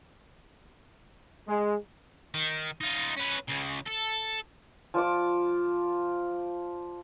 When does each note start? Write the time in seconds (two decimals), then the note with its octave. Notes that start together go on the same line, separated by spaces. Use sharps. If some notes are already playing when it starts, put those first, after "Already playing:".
1.48 G#3
2.35 D#3
2.81 D#4 F4
3.18 C#4 B4
3.50 C#2 C#3
3.87 A4
4.94 F3 D5 D6